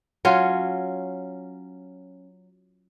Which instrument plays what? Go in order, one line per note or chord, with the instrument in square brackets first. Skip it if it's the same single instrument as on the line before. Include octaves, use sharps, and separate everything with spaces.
[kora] F#3 C#4 F4